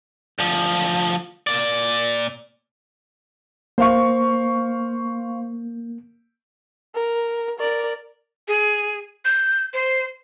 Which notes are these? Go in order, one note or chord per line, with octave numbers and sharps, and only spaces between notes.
D2 F3
A#2 D5
A#3 C5 F5 C#6
A#4
A#4 D5
G#4
G6
C5